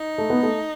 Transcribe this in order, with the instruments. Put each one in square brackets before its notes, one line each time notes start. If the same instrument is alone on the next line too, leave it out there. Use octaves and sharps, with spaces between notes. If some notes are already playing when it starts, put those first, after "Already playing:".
Already playing: [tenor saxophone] D#4
[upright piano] A3
B3
A3